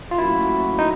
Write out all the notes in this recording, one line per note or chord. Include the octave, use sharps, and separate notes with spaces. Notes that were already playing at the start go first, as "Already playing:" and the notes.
F4
A2 F#3 A#3 C#4 E4 F#4
D#4